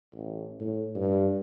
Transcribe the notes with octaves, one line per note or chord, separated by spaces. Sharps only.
A1
A2
G2